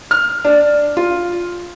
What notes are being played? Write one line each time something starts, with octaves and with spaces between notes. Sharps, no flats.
F6
D4
F4